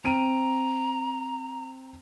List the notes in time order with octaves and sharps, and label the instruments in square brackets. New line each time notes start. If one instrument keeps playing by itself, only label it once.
[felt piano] C4 D7 D#7 [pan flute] A#5